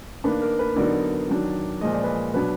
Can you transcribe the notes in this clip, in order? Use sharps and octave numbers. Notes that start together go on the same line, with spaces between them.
D#3 A#3 D4 B4
A#4
B4
D3 F#3 B3 D#4 A#4 D5
D#3 F#3 D4
A#2 F3 G#3 D#5
D5
B4 D#5
B2 F#3 D4 B4